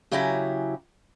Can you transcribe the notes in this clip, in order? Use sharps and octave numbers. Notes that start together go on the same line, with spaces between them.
C#3 F#3 E4 G4 G#5 A#5